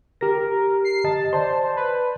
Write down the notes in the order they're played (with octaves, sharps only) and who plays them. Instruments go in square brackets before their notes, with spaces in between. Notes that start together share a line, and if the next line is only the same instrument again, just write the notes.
[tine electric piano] G4 A#6 [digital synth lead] A#4
[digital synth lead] C7
[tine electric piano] D#5 [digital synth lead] A5
[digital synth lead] C5 [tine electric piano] D5 A5 C6
[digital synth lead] B4